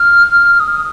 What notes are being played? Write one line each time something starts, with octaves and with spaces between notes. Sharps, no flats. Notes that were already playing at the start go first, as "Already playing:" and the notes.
Already playing: F6
F6
D#6